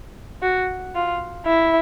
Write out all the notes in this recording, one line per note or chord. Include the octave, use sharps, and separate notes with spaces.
F#4
F4
E4